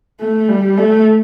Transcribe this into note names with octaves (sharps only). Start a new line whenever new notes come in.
A3
G3
A3